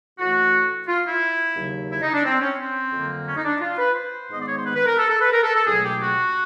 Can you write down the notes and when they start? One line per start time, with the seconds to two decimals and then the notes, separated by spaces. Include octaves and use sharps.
0.19 A2 E3 A3 F#4
0.87 F4
1.04 E4
1.56 D#2 C#3 F#3
1.90 E4
2.01 D#4
2.13 D4
2.24 C4
2.41 C#4
2.58 C4
2.92 F2 D3 F#3 A#3
3.26 C#4
3.36 D#4
3.44 D4
3.61 F4
3.78 B4
3.95 C5
4.29 G#2 D#3 G#3 B3 D#5
4.39 D5
4.47 C#5
4.55 C5
4.64 B4
4.74 B4
4.86 A#4
4.97 A4
5.09 A4
5.20 B4
5.32 A#4
5.43 A4
5.54 A4
5.66 C#2 B2 F#3 A3 G#4
5.83 G4
6.00 F#4